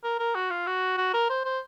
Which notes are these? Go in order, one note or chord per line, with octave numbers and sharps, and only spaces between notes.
A#4
A#4
F#4
F4
F#4
F#4
A#4
C5
C5